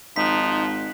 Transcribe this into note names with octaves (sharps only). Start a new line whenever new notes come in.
G#1 F3 D#4 F#6 B6